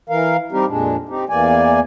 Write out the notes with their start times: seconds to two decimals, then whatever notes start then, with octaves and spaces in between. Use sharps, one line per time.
0.10 E3 A#4 F5
0.52 G3 C4 D#4 G4 A#4
0.68 F2 A#2 G#3 D4
1.09 C4 D#4 G4
1.29 E2 E3 A#3 D5 G#5